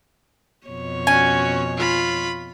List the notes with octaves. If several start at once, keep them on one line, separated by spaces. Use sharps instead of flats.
F2 B2 C#5
C#4 F#4 G#5
F4 B5